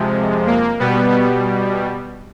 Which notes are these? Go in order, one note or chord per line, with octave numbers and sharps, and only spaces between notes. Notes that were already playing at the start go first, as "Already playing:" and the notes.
Already playing: F2 C3 F3 G#3
A#3
B2 G3 B3